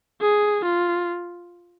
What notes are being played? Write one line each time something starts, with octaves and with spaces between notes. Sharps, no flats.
G#4
F4